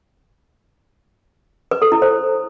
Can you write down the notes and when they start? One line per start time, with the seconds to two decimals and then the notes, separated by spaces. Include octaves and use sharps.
1.71 B4
1.82 A4
1.92 E4
2.02 C5